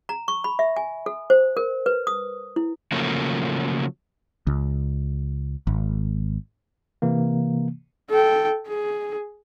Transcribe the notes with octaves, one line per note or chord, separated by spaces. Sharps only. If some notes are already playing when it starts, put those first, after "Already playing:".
A#5
C#6
B5
E5
G#5
A4
C5
A#4
B4
D#6
E4
C#3 F3 F#3 A3 A#3
C#2
G#1
C3 E3 A#3
A4 G5
G#4